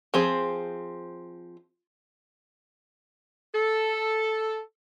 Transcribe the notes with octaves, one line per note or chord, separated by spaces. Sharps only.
F3 C4 G#4
A4